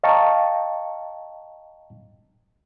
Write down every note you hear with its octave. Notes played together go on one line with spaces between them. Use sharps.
D#5 F5 G5 A5 A#5 C#6